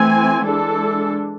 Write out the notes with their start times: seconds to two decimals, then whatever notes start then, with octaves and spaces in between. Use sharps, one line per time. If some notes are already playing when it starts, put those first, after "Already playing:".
Already playing: E3 A3 C4 G#5
0.44 E3 G#3 D4 A4